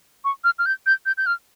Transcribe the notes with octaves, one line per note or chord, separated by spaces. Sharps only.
C#6
F6
F6
G6
G6
G6
G6
F6